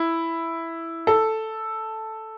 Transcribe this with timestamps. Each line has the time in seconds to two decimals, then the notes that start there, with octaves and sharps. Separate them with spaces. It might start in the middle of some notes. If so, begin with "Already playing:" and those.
Already playing: E4
1.07 A4